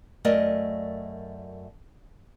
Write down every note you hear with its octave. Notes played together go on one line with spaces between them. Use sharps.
F#2 A3 A#4 D5 D#5